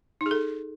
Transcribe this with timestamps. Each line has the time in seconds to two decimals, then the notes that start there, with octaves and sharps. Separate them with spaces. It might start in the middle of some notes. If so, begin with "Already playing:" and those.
0.21 D#4
0.26 G#4
0.31 A4